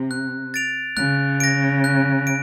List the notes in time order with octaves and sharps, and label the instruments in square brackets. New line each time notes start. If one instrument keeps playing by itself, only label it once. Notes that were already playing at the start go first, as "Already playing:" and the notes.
Already playing: [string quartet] C3
[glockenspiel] F#6
A6 D7 F7
[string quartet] C#3 [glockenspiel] F#6
[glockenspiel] A#6 D7
F#6
D7